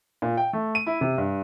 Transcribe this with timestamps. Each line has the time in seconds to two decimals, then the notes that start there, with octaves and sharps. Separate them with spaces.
0.22 A#2
0.37 G5
0.53 A3
0.75 D#7
0.87 E4
1.01 C3
1.18 G2